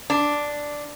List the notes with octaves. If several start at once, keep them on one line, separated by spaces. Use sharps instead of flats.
D4